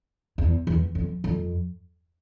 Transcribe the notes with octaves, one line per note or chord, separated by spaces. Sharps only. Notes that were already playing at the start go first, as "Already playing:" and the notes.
E2
E2
F2
F2